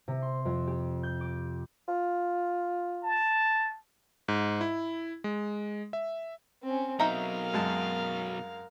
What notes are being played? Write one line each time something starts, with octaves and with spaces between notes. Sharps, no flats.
C3
C6
F2
G4
G6
D6
F4
A5
G#2
E4
G#3
E5
C4 C#4
B2 F#3 D#4 A#4 E5 F5 A#5
F#2 G#3 A5